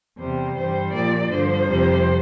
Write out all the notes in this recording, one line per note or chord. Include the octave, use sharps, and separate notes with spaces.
E2 C3 G3 C5
G2 E3 G3 C5
A#2 F3 D5
G2 D3 F3 C5
F2 C3 G3